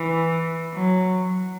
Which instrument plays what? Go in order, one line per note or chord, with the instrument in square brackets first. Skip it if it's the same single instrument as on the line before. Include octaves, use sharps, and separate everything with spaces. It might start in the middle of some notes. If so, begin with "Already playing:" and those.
Already playing: [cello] E3
F#3